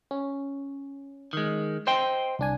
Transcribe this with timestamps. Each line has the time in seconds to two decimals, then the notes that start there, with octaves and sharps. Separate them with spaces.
0.11 C#4
1.33 D#3 G#3
1.87 C5 D#5 G5 C6
2.39 C2 D4 G#5